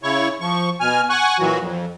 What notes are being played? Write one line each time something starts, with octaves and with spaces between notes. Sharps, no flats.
C#3 E4 C#5 C#6
F3 C#6
B2 G#5 F6
F#5 G#5 C#6 F#6
A#2 E3 F#3 F#4
F2